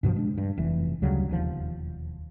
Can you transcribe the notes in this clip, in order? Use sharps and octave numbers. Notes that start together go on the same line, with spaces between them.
G2 B2 E3 F3
G#3 D4
G2
F1 E3
D2 C#3 F#3 G3
E1 D#2 F3